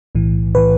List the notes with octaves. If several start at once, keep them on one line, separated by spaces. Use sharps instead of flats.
B1 A2 E3
A2 E3 B4